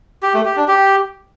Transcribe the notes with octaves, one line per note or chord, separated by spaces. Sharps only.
G4
A3
G4
D4
G4